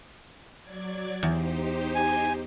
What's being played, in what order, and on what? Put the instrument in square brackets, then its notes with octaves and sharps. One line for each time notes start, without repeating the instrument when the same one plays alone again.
[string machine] F#3 D5 G#6
[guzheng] E2 [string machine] D#4 G4 C5
[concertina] G#5